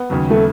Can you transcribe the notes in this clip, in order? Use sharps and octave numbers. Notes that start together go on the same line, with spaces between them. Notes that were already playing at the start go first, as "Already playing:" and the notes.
Already playing: B3
D#2 C#3 F#3
A3